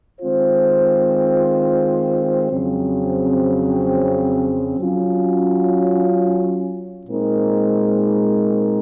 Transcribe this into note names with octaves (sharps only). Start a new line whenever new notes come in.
D#3 G#3 C4 F4 C5
F2 C#3 F#3 C4
F#3 C#4 F4
A#2 G#3 C4 D#4 A#4